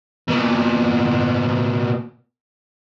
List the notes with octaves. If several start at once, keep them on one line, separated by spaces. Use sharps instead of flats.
B2 A#3